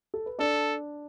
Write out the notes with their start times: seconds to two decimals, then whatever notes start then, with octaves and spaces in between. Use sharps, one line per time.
0.14 A4
0.26 B4
0.39 D4 A4 D5